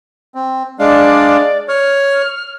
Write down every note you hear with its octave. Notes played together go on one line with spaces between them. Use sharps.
C4
G#3 D4 D5 F5
C#5 F6